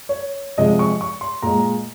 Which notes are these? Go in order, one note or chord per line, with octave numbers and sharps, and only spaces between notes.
C#5
C3 F3 G#3 D#5
C#6
C#6
C6
A#2 G#3 A#5